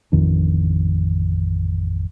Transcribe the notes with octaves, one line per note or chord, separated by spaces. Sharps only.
A1 F2 D#3 D4